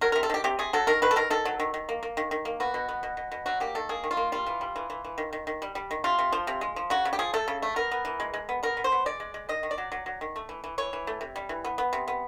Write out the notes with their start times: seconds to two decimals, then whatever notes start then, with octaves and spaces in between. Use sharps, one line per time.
0.01 F#3 A#4
0.12 C3 A#4
0.23 A4
0.30 D#3 G4
0.44 C3 G4
0.59 C3 G#4
0.73 F#3 A4
0.87 D#3 A#4
1.02 D#3 B4
1.11 A4
1.16 D#3 A#4
1.30 D#3 A4
1.45 F#3
1.60 D#3
1.74 D#3
1.89 A#3
2.03 A#3
2.17 D#3
2.31 D#3
2.45 A#3
2.60 B3 F#4
2.74 B2
2.89 B3
3.03 B2
3.17 B2
3.32 B2
3.46 F#3 F#4
3.60 A#3 G4
3.75 D#3 A4
3.89 A#3 G#4
4.04 D#3
4.11 F4
4.17 A#3
4.32 G3 F4
4.46 E3
4.61 G3
4.76 E3
4.90 E3
5.05 E3
5.18 D#3
5.33 D#3
5.47 D#3
5.62 G3
5.75 G3
5.91 D#3
6.04 C3 F4
6.19 C3
6.33 F3
6.47 C3
6.61 G#3
6.76 F3
6.90 C#3 F#4
7.05 C#3
7.13 G4
7.19 F3 G#4
7.34 A3 A4
7.48 C#3
7.62 A3
7.76 B3 A#4
7.92 B3
8.05 E3
8.20 G#3
8.34 G#3
8.49 B3
8.63 B3 A#4
8.77 B3
8.84 C5
8.92 B3
9.06 G#3 D5
9.20 G#3
9.34 G#3
9.49 D#3 D#5
9.63 D#3
9.71 D5
9.78 F#3
9.92 F#3
10.06 F#3
10.21 D#3
10.36 A3
10.49 E3
10.64 E3
10.78 E3 C#5
10.93 E3
11.07 A3
11.21 C3
11.36 G3
11.49 E3
11.65 B3
11.78 B3
11.93 C3
12.08 B3